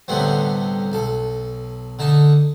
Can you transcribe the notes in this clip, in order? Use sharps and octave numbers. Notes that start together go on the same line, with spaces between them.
C2 A2 D3 G3 B3 C4
B1 A4
D3 D#4 A5